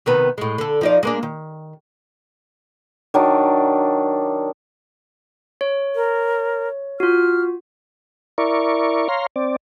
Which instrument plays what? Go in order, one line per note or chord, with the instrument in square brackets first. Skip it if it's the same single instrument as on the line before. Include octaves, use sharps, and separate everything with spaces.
[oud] C3 D#3 B3
A2 G#3
D3 A4
F3 D#4 D5
G#3 A#3 D4
D#3
[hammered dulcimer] D#3 F#3 D4
[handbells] C#5
[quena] A#4
[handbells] F4 F#4 [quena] F6
[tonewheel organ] E4 A#4 D5 C#6
C#5 F5 A#5 C6
C4 D5